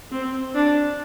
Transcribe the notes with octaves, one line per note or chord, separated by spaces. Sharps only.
C4
D4